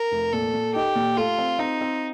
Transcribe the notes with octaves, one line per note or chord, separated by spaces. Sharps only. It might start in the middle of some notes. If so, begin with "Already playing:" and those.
Already playing: A#4
F1
A#2 A4
A#2
D#4 G4
A#2
A3 F4
C4
C4 D#4
C4